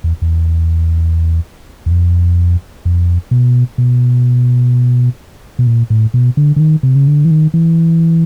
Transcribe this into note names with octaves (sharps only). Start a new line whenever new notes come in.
E2
E2
E2
F2
F2
B2
B2
B2
A#2
A2
B2
D3
D3
D#3
C3
C#3
D3
E3
D#3
E3